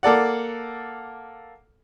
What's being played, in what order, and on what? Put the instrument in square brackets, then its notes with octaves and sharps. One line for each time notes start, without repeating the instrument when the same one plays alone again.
[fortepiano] A#3 A4 D5 F#5